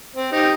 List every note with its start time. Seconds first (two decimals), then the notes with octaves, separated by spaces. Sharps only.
0.15 C4
0.32 D#4 G4